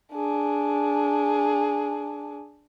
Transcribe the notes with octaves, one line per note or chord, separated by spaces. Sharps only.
D4 G#4